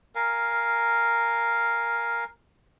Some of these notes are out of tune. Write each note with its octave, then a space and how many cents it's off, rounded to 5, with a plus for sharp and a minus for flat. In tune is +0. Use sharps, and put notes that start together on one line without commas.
A#4 +0 F5 -5 G#5 +0